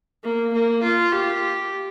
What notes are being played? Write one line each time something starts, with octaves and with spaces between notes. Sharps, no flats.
A#3
A#3
F4
G4